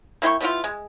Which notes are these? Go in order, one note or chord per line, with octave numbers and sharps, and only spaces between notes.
A#3 E4 G5 C#6
G3 B3 E4 F4
G#3